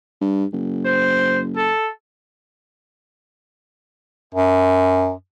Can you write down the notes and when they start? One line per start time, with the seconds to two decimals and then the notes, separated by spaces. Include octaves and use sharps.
0.21 G2
0.53 F#1
0.85 C5
1.56 A4
4.34 F#2